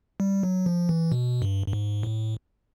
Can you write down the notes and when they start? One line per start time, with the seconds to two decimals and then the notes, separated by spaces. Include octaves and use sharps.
0.20 G3
0.43 F#3
0.66 F3
0.89 E3
1.12 B2
1.42 G2
1.68 G2
1.73 G#2
2.03 A2